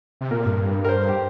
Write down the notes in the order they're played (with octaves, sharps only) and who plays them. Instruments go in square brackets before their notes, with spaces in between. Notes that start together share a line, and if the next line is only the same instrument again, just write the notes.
[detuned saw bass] C3
[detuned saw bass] A#2 [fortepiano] A#4
[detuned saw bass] G2
[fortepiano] A#4
C5
G4